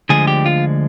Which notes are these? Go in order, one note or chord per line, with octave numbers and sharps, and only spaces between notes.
D2 D3 F3 G#3 G#4
G4
F4